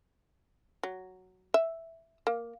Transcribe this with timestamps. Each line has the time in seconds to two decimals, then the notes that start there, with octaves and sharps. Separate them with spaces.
0.83 F#3
1.54 E5
2.27 A#3